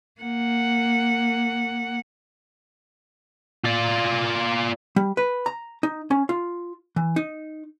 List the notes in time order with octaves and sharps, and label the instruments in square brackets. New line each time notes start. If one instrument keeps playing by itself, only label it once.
[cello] A#3 F#5
[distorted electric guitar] F4 D5
[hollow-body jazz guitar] G3
B4
A#5
D#4
C#4
F4
E3
D#4